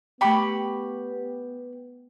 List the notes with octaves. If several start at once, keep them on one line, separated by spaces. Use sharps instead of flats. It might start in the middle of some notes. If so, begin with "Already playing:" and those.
A3 B3 G4 G5 B5 C#6